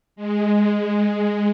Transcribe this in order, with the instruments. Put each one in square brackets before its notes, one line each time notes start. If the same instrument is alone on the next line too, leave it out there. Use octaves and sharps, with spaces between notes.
[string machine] G#3